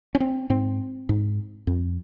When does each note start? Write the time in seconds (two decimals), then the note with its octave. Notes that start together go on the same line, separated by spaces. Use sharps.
0.15 C#4
0.20 C4
0.50 G#2 C4
1.09 G#2
1.67 F2